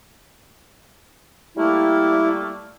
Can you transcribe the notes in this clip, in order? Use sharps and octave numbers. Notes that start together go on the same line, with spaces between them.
G3 A3 A#3 E4